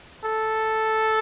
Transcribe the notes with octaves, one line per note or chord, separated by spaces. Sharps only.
A4